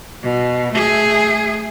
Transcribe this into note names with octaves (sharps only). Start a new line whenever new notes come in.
B2
A3 G#4